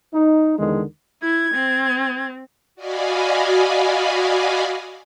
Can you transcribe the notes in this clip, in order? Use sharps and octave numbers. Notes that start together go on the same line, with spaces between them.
D#4
E2 D3 D#3 G#3
E4 G#6
C4
F#4 D5 D#5 F5 G#5 B5